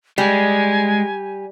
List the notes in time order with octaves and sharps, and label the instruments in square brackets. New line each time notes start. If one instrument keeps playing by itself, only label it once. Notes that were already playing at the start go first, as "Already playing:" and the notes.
[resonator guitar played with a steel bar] G3 [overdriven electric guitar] G#3 [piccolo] G#5